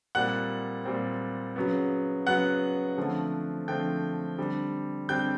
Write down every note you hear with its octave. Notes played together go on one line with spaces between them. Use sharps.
A#2 G3 C4 F#5 F#6
A#2 G3 C4
C#3 F#3 B3
C#3 F#3 B3 F#5 F#6
D3 F3 A3 C4
D3 F3 A3 C4 G5 G6
D3 G3 C4
D3 G3 C4 G5 G6